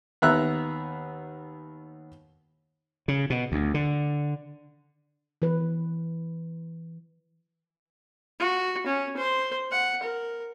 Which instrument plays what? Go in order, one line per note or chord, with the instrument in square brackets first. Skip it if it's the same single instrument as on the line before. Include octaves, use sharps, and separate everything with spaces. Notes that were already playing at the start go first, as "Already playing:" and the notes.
[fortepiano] D#2 B3 E5 A#5 F#6
[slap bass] C#3
B2
D2
D3
[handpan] E3 B4
[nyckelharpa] F#4
C#4
C5
F#5
A#4